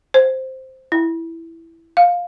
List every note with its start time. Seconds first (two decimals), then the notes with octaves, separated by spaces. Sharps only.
0.14 C5
0.92 E4
1.97 F5